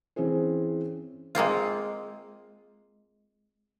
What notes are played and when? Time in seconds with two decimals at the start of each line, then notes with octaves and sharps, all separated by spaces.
0.16 E3 C4 C#4 G#4 C5
1.35 G#3 A#3 C4 F4